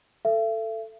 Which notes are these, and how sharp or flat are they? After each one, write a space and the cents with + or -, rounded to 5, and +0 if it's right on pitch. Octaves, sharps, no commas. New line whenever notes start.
A4 +10 E5 +40